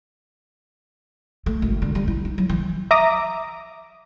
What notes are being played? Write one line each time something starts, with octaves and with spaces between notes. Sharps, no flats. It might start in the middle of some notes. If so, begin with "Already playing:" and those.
A3
G#1
D3
G3
E4
D#4
F#3
E3
E5 A#5 D6 D#6